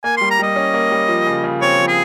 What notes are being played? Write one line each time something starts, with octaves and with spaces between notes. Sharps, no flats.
A#3 G#5
G3 C6
A#5
G3 D#5
C#4
A#3
G3
F3
C#3
C#3
C4 C#5
F3
G#4